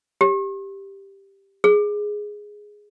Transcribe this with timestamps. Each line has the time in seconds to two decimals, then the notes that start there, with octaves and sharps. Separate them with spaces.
0.21 G4
1.64 G#4